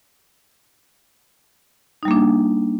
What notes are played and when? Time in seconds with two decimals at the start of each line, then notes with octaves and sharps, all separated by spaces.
2.03 D#4
2.05 G3
2.08 A#3
2.11 D4